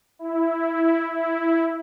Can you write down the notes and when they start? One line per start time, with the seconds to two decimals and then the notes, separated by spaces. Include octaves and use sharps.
0.19 E4
1.13 E4